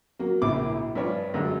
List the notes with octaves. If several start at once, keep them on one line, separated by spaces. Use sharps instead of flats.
F#3 A#3
A#1 C#3 C#4 E4 D6
G2 F3 C#5 D5
F#2 D3 G#3